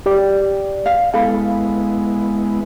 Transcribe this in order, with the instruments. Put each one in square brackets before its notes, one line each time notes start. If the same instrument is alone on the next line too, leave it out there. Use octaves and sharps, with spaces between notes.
[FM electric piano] G4 D5
[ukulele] F5
[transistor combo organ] G#3 B3 E4 [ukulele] A4 [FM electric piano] F5 B5